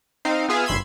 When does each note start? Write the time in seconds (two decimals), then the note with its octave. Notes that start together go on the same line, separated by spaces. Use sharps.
0.25 C4 D#4 C5 F5
0.49 B3 F4 G#4 E5 F5
0.66 G1 B5 C6 E6 G#6